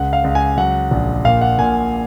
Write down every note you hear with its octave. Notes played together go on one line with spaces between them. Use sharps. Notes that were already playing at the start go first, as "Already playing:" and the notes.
Already playing: C#2 F#5
F5
C#2
G#5
F#3 F#5
A#1
A#2 F5
F#5
A#2 G#5